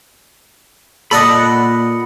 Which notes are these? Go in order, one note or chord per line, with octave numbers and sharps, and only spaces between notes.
A#2 A4 D5 D#5 F#5 B5